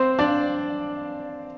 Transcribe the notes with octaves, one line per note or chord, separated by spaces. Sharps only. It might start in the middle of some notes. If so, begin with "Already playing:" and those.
Already playing: C4 C5
D4 D5